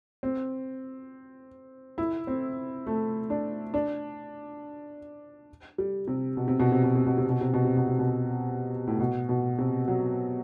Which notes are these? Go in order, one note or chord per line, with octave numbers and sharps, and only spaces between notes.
C4
E4
C4
A3
D4
D4
G3
C3
B2
C3
B2
C3
B2
C3
B2
C3
B2
C3
B2
C3
B2
C3
B2
A2
B2
B2
C3
F#3